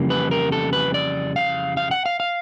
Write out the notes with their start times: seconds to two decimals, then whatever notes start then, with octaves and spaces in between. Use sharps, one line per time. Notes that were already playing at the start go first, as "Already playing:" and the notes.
Already playing: F2 C#3 E3 G3 A#3
0.10 B4
0.31 A#4
0.52 A4
0.73 B4
0.94 D5
1.36 F5
1.77 F5
1.91 F#5
2.06 F5
2.20 F5